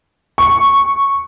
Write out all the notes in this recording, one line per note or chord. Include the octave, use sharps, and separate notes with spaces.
C#6